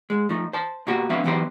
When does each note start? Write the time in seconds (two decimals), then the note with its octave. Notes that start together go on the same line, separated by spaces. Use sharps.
0.10 G#2 G#3
0.29 F3 A3 D#4
0.53 C5 A5
0.87 B2 A#3 F#4 G4
1.09 D3 F3 B3 C4 E5 F5
1.24 E3 F#3 B3 D#4 G4 C5